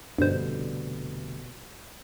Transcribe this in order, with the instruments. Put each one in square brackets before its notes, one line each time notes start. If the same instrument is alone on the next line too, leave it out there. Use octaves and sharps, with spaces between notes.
[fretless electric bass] F1 D3 G3 [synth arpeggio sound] G2 C5 [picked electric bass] B2